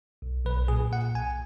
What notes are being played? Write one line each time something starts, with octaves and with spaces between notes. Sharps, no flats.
B1
B1 B4
A#2 G#4
A#2 F#5
B1 G#5